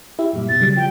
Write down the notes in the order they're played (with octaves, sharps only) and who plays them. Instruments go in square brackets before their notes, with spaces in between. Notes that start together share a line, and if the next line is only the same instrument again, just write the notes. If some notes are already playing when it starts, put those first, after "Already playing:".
[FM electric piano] E4 G4 E5
F#2 A#2 G3
[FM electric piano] B2 [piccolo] A6
[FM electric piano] C#3 F#3 G3
[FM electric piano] F3 [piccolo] G5